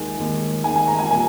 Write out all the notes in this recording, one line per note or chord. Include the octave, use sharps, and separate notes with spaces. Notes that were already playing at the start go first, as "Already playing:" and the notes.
Already playing: D#2 D#3 G#3 G#5
D#2 D#3 G#3
D#2 D#3 G#3 G#5
G#5
A#5
G#5
A#2 G3 A#3 G#5